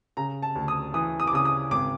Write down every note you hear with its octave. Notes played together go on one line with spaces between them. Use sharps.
C#3 A#5
A5
D2
D#6
E3 D#6
D#6
D6
C#3 D#6
D#6
G#1 D6